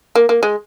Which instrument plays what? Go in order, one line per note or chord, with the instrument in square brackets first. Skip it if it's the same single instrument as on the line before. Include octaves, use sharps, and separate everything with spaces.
[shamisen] A#3
A#3
G#3